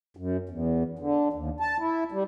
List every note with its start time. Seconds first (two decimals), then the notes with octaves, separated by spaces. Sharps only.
0.17 F#2
0.49 E2
0.99 D3
1.33 D#2
1.60 A5
1.79 E4
2.12 G3